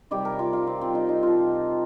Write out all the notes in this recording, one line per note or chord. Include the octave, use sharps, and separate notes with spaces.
C3 D#3 G3 G4
A#4
F4
F4
C4
C4
D#4
D#4
C3 F3 F4